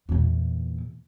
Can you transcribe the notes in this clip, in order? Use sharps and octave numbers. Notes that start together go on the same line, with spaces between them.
E2 A#2